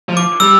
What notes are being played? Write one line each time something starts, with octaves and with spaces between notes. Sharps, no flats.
F3
D6
G3 E6